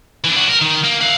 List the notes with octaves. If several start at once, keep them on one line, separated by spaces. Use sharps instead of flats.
E3 D4
D4 F#4
A#4
D#3
A#3
F5 F#5